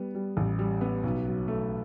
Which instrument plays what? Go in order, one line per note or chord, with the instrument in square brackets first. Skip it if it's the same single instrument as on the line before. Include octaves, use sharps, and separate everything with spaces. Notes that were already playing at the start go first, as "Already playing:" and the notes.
Already playing: [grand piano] G3 B3
G3
A1
G3
B3
B1
F#3
A3